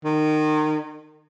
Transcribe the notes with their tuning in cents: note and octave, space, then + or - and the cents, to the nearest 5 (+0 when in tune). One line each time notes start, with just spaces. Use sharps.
D#3 -25